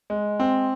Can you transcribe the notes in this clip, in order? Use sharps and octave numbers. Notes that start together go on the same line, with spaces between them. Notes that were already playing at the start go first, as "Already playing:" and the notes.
G#3
C4